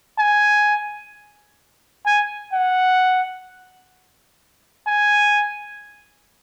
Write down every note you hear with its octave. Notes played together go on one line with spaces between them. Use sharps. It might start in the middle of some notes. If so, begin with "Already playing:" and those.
G#5
G#5
F#5
G#5